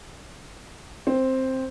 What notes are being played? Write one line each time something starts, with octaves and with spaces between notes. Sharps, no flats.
C4